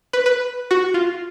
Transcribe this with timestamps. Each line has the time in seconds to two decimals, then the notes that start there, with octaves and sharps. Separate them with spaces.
0.13 B4
0.26 B4
0.71 F#4
0.94 F4